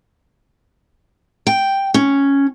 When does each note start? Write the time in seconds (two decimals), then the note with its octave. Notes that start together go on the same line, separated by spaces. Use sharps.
1.47 G5
1.94 C#4